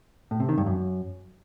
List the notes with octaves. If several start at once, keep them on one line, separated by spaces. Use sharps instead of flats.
A2
C3
D#3
G2
F#2